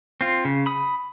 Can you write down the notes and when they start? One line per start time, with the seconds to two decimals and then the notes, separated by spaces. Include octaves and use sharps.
0.21 C4 F4
0.45 C#3
0.66 B5 D#6